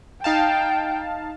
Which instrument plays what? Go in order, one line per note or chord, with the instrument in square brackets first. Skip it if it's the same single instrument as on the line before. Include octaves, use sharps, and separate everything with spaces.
[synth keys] D#4 F5 A5 [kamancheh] G5